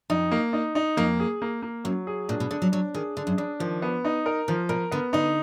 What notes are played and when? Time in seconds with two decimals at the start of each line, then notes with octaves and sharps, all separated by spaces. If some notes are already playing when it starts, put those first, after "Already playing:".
0.10 F2 D#4
0.31 A#3
0.53 D#4
0.75 D#4
0.97 F2 A#3
1.20 G#4
1.42 A#3
1.62 A#3
1.84 F#2 F#3
2.07 G#4
2.29 A#2 D4
2.40 B2
2.51 D3 D4
2.62 F#3
2.72 F#3 D4
2.95 D#3 G#4
3.17 D3 D4
3.27 F#2
3.38 F2 D4
3.60 D#3 F3
3.82 B3
4.05 D#4
4.26 A#4
4.48 D#3 F3
4.69 B2 A#4
4.91 D3 B3
5.13 D3 D#4